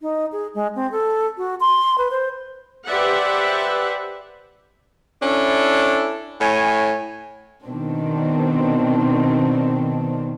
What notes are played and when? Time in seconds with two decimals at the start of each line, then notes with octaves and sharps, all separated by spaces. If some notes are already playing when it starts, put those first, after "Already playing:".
0.02 D#4
0.32 G#4
0.54 G#3
0.75 C4
0.91 A4
1.38 F#4
1.60 C6
1.98 B4
2.11 C5
2.87 G4 B4 C5 D5 E5 F#5
5.22 C#4 D4 E4 A4
6.41 A2 C#5 G#5
7.66 B2 D#3 C4 D4